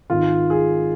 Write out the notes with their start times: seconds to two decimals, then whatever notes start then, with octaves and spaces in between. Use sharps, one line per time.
0.10 G#1 G#2 D#3 F4
0.50 G#4